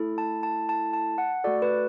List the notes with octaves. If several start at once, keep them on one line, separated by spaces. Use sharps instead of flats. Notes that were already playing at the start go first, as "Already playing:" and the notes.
Already playing: A3 E4 A4
A5
A5
A5
A5
F#5
A3 F#4 A4 D5
B4